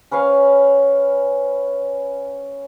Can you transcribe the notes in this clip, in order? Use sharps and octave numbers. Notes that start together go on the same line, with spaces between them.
C#4 B4 C#5 F5